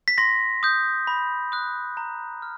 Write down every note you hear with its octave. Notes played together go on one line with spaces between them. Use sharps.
B6
C6 A#6
D#6 G6
B5
D#6 F#6
A#5
F6